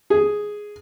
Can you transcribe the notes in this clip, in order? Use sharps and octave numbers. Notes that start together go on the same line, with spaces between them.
G#4